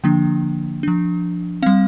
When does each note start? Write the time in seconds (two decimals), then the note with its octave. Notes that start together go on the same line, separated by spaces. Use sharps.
0.04 D3 F3 A#3 D4 G5
0.83 F3 D4
1.63 G3 C4 F5